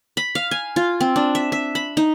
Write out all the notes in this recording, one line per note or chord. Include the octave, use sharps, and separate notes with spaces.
B5
F5
G#5
F4
C4
D4
E5
E5
B5
D#4